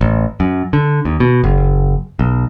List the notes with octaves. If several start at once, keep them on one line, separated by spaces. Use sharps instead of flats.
A1
F#2
D3
D#2
B2
F#1
B1